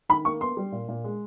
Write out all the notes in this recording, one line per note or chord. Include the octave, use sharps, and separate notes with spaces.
D#3 B5
A#3 C#6
B3 C6
G3
A#2
A#2
G#3